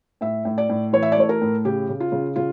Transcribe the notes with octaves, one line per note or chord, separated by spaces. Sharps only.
A2 E5
A2
D5
A2
E3 C#5
E5
D5
A3 C#5
A#4
A2
C#3 G4
C#3
F4
C#3
C#3 F4